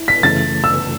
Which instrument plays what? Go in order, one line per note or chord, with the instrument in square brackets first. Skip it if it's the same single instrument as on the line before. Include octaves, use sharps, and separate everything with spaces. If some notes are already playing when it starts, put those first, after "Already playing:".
Already playing: [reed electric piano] E4
[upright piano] B6
[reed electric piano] F#2 C#3 E3 A3 [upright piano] A6
[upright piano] E6